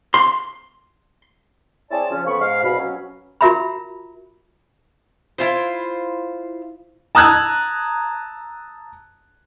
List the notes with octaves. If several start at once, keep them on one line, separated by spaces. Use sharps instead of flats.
C6
C4 E4 G#4 C#5 D5 A5
C#3 F3 C#4
F2 C#3 F3 B3 B5 C#6
G#2 F5
C2 B2 F5 B5
F#3 C#4
F4 F#4 A#4 E5 A#5 B5
E4 F4 C5
A5 A#5 D#6 E6 F#6 G#6